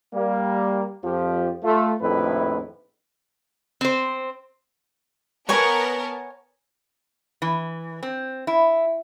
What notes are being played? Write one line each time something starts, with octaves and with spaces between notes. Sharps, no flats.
G3 A#3
F2 F3 G4
A3 F4
A#1 F2 A2 D#3 E4 B4
C4 C5
B3 A#4 C#5 G#5 A5 C#6
E3
C4
E4